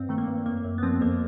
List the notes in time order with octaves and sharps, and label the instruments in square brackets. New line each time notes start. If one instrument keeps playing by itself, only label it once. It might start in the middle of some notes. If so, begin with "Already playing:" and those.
Already playing: [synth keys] G2 C4
D#3 A3
A#3
G2
F#2 A#3
F#2
B3
F3 C4
F2 A#3